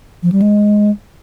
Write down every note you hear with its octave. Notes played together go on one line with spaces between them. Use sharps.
F3
G3
G#3